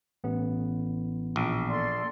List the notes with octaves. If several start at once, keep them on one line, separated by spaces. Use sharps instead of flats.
A1 B3
A#1
A4 D5 C6